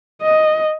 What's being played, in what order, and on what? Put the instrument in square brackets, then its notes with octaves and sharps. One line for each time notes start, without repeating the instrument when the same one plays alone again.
[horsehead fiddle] D#5